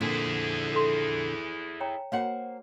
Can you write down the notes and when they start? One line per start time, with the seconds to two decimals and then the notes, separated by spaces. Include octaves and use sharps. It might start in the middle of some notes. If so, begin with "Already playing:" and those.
0.01 F2 A#2 D3 E4 G#4
0.73 A4 C6
1.80 C#5 G5 A#5
2.12 A#3 F#4 C5 C#5 F5 F#5